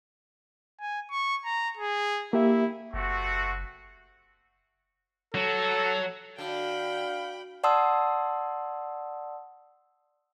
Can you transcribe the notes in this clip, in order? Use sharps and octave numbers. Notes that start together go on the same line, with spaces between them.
G#5
C#6
A#5
G#4
A#3 E4 G4 E5
F#1 A3 C4 F#4
F#3 A4
D3 F#4 F5 G5 B5
D5 F#5 A5 C6 D#6 E6